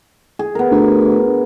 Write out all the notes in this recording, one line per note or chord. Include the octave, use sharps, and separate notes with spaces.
G#4
B3 A#4
D2